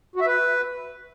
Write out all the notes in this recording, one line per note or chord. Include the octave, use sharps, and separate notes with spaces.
F#4
E5
B4